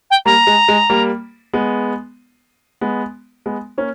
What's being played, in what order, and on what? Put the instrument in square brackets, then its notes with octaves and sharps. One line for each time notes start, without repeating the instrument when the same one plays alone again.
[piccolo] G5
[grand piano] G3 A#3 [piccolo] A#5
[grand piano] G#3
G#3
G3 A#3
G#3 B3
G#3 B3
G#3 B3
A#3 C#4